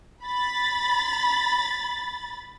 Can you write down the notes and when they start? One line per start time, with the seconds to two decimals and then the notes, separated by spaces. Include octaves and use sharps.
0.24 B5 A6